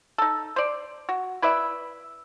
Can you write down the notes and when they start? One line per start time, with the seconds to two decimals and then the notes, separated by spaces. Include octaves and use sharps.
0.18 D#4 A4
0.56 C5 D5
1.09 F#4
1.42 E4 B4 D5 E5